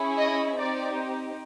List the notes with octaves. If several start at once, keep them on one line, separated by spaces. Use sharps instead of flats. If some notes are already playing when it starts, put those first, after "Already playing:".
Already playing: C#4 E4 G#4
D#5
C4 D#4 G4 D5